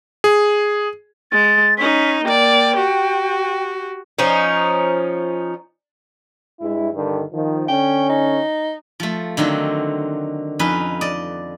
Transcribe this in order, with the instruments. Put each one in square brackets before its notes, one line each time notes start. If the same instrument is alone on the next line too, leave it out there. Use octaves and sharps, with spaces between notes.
[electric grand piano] G#4
[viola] G#3 [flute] A6
[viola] C#4 D#4 [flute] B6
[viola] A#3 D5 [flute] G5
[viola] F#4 G4
[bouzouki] F3 C#4 D#4
[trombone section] G2 G#3 E4
G2 D3 D#3
D#3 F3
[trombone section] D3 C#4 [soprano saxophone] G5
[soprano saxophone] D#4
[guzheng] F3 A3
D3 D#3 F#3 C4
F2 C#4 D#4 B4
D5 D#5